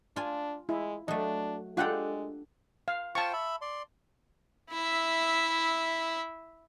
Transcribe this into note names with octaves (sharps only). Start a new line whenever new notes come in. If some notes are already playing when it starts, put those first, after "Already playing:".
D4 F4 G#5
G#3 E4
F#3 A3 D4 D#5
G#3 D4 F4 G4 A4 F#5 G5
F5
F4 C5 G5 A5 C#6
E5 B5
D5 C6
E4 E5